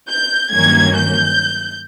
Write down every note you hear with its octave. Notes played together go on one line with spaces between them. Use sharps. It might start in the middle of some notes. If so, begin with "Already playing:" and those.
G6
G2 D#3 F#3 A#3 C#4 G#6
G6